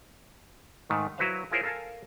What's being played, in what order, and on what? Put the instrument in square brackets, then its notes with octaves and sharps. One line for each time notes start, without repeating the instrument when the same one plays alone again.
[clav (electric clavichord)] G#2 D#3 A3
F#3 E4 F#4 B4 C5 F5
E4 F4 G#4 A#4 C5 C#5
A4 A#4 F5 G#5 A5